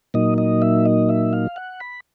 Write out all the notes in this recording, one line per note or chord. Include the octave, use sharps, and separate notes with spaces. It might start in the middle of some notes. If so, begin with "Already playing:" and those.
A#2 F#3 A#3 D#4 D#5
D#5
E5
D#5
E5
F5
F#5
B5